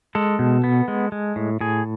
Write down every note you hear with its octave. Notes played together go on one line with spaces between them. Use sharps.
G#3 A4
B2
B3
G#3
G#3
A2
A2 G#4